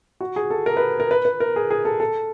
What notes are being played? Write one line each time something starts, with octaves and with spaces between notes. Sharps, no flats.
F#4
G#4
A4
A#4
B4
A#4
B4
B4
A#4
G#4
G#4
A4
A4